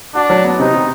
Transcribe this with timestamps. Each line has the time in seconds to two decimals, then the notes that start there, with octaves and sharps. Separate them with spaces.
0.15 D4 F#4
0.30 F#3
0.45 B3
0.59 C3 D#4
0.74 C3